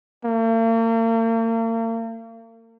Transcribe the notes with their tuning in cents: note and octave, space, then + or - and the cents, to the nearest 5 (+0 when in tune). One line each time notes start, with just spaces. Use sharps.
A#3 -40